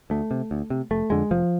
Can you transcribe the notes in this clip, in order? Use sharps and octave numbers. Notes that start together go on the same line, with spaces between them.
D2 A3
C3
D2
C3
F1 A3
F2 D3 G#3
F1 F3